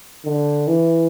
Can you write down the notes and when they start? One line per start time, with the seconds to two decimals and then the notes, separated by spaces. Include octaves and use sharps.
0.25 D3
0.68 E3